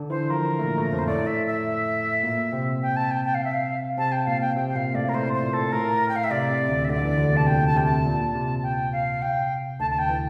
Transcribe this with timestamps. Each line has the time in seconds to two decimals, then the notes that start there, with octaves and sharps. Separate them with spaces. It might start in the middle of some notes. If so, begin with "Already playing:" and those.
Already playing: D3 D4
0.10 E3 E4 C5
0.29 F3 F4 A#4
0.59 A3
0.63 A#2 A#3
0.78 A2 A3
0.93 F2 F3
0.99 C5
1.07 A2 A3 D5
1.27 E5
1.47 E5
2.23 A#2 A#3
2.53 C3 C4
2.82 G5
2.96 A5
3.11 G5
3.25 G5
3.34 F5
3.44 E5
3.54 F5
3.97 C3 C4 A5
4.12 G5
4.27 A#2 A#3 F5
4.41 G5
4.56 C3 C4 G5
4.68 G5
4.76 A#2 A#3 F5
4.95 A2 A3 D5
5.09 A#4
5.14 A2 A3 C5
5.33 C5
5.43 A#2 A#3
5.53 A4
5.72 A2 A3 A#4
6.09 G5
6.16 F5
6.24 E5
6.31 C3 D5
6.50 C3
6.69 D2 D3
6.85 E5
6.89 D2 D3 D5
7.03 E2 E3
7.18 D2 D3
7.32 C3 A5
7.47 A#2 G5
7.67 A5
7.76 C3 G5
7.85 A5
8.06 A#2
8.34 C3
8.63 G5
8.92 F5
9.22 G5
9.80 D2 D3 A5
9.91 A5
9.99 G5
10.09 E3